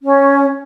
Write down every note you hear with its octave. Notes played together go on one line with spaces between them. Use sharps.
C#4